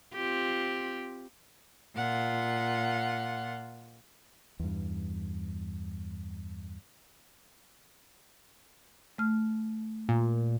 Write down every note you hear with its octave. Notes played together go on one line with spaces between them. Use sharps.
C4 F4 G4
A#2 F4 F#5
E2 G2
A3 F6
A#2